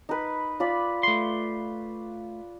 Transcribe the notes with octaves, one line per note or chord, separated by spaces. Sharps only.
D#4 B4
F4 D5 B5
A3 C6